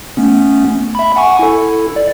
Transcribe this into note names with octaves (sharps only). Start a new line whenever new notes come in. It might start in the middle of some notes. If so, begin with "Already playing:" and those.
A3 B3 C#4
E5 B5
F#5 G#5 C#6
E4 A4
D5